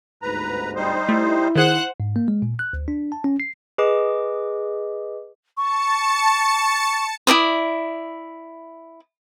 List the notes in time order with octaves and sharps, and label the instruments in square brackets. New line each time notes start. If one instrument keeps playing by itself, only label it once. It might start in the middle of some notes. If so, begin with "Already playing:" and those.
[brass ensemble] G1 D2 G#2 [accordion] B4 A#5
[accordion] G3 D#4 C5
[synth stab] A3 [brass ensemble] E4
[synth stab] D#3 G#4 [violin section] C5 F#5 F#6
[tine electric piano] G#2
A#3
G#3
A#2
F#6
D2
D4
A5
C#4
C7
[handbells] G#4 B4 D#5 D6
[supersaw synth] A5 C#7 [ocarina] C#6
[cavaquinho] E4 A#4 D5 D#6